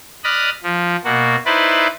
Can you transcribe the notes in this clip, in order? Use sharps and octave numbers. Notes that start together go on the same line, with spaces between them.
D5 D#5 B5 D#6 F6 F#6
F3
B2 A#3 F#4
D#4 E4 B4 C5 D5